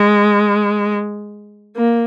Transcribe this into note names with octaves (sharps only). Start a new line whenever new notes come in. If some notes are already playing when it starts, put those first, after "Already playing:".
Already playing: G#3
A#3